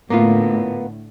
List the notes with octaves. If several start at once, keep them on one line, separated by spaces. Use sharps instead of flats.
A2 D3 A#3 B3 F4